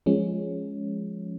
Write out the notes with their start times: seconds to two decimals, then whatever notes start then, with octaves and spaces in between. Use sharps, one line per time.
0.06 F3 G#3 C#4